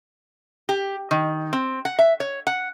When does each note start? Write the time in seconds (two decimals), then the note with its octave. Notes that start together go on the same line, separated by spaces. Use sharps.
0.69 G4
1.11 D#3
1.53 C4
1.85 F#5
1.99 E5
2.20 C#5
2.47 F#5